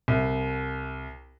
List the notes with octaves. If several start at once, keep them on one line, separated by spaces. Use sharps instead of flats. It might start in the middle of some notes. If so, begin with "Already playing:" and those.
C2